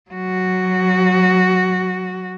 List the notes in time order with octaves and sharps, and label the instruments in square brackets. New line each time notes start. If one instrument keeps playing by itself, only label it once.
[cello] F#3 F#4